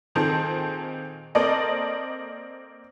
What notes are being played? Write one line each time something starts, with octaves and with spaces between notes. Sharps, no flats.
A#2 D#3 C4 G#4 A4
A#3 C4 A4 D5 D#5